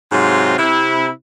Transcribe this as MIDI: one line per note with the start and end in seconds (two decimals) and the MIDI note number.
0.12 0.55 44
0.12 0.55 48
0.12 0.55 54
0.12 0.55 60
0.12 0.55 65
0.58 1.09 48
0.58 1.09 64